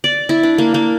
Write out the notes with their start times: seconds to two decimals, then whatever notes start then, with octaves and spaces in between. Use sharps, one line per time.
0.04 D5
0.29 E4
0.43 D4
0.58 A#3
0.74 A#3